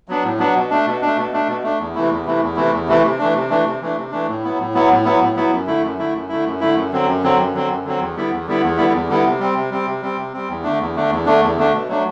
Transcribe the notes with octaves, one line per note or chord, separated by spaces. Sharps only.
F#3 B3 D4
A2
F#3 B3 D4
B2
A3 D4
B2
A3 D4
B2
A3 D4
B2
A3 D4
E2
C3 E3 A3 E4
E2
C3 E3 A3 E4
E2
C3 E3 A3 E4
E2
C3 E3 A3 E4
C3
E3 A3 D4
C3
E3 A3 D4
C3
E3 A3 D4
C3
E3 A3 D4
A2
F#3 B3 E4
A2
F#3 B3 E4
A2
F#3 B3 E4
A2
F#3 B3 E4
F#2
D3 A3 E4
F#2
D3 A3 E4
F#2
D3 A3 E4
F#2
D3 A3 E4
F#2
D3 F#3 C4
F#2
D3 F#3 C4
F#2
D3 F#3 C4
F#2
D3 F#3 C4
E2
D3 G3 B3 E4
E2
D3 G3 B3 E4
E2
D3 G3 B3 E4
E2
D3 G3 B3 E4
C3
G3 C4
C3
G3 C4
C3
G3 C4
C3
G3 C4
E2
D3 A3 D4
E2
D3 A3 D4
E2
D3 A3 D4
E2
D3 A3 D4
B2
F#3 A3 D4